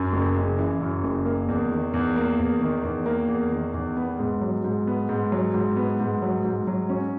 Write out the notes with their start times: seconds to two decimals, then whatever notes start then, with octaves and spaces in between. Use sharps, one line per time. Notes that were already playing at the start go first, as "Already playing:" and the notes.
Already playing: F#2
0.13 F#1
0.36 C#3
0.58 E3
0.81 F#2
1.03 F#1
1.25 A#3
1.48 E2
1.71 D#3
1.94 E2
2.16 A#3
2.39 E2
2.61 D#3
2.84 E2
3.06 A#3
3.28 E2
3.52 D#3
3.74 E2
3.97 B3
4.19 G#2
4.41 F#3
4.64 G#2
4.87 B3
5.09 G#2
5.32 F#3
5.54 G#2
5.76 B3
6.00 G#2
6.22 F#3
6.45 G#2
6.67 F#3
6.89 C#4